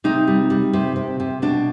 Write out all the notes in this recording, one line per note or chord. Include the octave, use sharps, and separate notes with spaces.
C3 D#4
G3
G3
C3
C3
C3
B2 D4